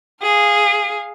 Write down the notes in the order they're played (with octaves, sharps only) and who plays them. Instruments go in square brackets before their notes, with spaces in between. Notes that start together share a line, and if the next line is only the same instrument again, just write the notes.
[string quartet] G#4 F5